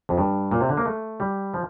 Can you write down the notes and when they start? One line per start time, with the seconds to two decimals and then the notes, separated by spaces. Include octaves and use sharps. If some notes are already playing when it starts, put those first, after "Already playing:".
0.09 F2
0.18 G2
0.51 A#2
0.61 C3
0.69 D3
0.77 A#3
0.85 A3
1.20 G3
1.54 F3